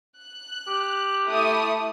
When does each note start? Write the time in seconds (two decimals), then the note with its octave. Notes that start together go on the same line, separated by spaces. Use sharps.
0.19 F#6
0.67 G4
1.27 A3 E4 D#6